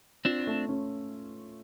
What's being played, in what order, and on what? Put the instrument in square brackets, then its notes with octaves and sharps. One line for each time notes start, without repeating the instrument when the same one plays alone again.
[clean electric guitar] C4 D4 [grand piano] F4
[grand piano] A3
C#4